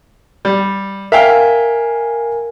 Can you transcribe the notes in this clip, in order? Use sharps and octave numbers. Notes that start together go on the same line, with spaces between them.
G3
A#4 E5 F5 G5 G#5